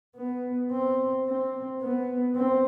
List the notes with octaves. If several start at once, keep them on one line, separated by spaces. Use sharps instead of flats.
B3
C4
C4
B3
C4